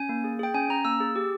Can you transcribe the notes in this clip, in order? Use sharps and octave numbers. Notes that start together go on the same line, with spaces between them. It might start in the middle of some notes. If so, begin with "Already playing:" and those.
Already playing: C#4 G#5
A#3
G#4
G#4 G5
C#4 G#5
C#4 A#5
A#3 E6
G#4
G4